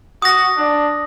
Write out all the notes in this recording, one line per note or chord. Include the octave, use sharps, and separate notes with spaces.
F#4 D#6 A#6
D4